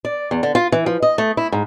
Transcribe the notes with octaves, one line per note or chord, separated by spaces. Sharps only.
D5
E2
D3
F4
E3
F3
D#5
A3
E4
G#2